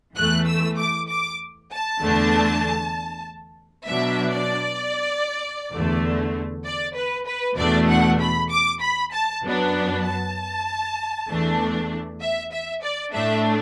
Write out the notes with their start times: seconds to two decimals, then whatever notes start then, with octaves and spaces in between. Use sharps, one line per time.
0.16 E2 E3 A3 F#6
0.47 E6
0.77 D6
1.09 D6
1.71 A5
2.02 E2 D3 A3 D4
3.86 B2 F#3 D4 E5
4.33 D5
5.72 E2 D3 A3
6.64 D5
6.95 B4
7.27 B4
7.57 E2 B2 A3 D4 D5
7.88 F#5
8.20 B5
8.50 D6
8.81 B5
9.12 A5
9.42 F#2 F#3 B3 D4
10.05 A5
11.28 E2 E3 A3 D4
12.21 E5
12.51 E5
12.82 D5
13.13 A2 A3 D4 E5